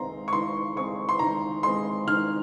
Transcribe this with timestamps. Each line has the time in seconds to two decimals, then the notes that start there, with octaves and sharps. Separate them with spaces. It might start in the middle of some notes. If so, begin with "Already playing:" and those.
Already playing: D#3 G#3 C4 A#5 C6
0.28 C#6
0.33 D#3 C6
0.76 G#3 C4 C#6
1.09 C6
1.19 D#3 A#5
1.63 G#3 C4 C6
2.07 D#3 F6